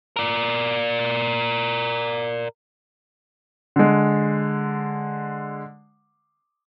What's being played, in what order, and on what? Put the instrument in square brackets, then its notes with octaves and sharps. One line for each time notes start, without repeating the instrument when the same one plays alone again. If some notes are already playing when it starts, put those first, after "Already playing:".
[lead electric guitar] A#4 D5
[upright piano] D3 G#3